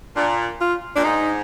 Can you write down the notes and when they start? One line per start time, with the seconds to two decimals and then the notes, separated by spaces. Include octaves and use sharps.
0.16 A#2 D4
0.61 F4
0.96 A#2 D4
1.05 G#2 D#4